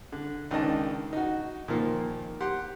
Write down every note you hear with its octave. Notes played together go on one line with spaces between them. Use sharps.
D3
C#2 D#3 D4 D#5 A5
D#4 F#4
A#2 D#3 F3 A#3
G4 F#5 C6